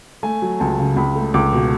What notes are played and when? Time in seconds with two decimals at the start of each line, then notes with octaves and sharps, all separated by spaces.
0.23 A3 G#5
0.42 F#3
0.60 C#2 A5
0.79 C#3
0.96 C#2 B5
1.16 A3
1.34 C#2 D6
1.53 B2